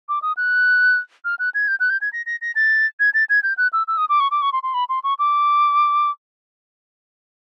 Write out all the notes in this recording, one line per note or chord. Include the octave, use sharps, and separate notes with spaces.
D6
D#6
F#6
F6
F#6
G#6
G6
F#6
G6
G#6
A#6
A#6
A#6
A6
G#6
A6
G#6
G6
F#6
E6
E6
D#6
D6
C#6
D6
C#6
C6
C6
B5
C6
C#6
D6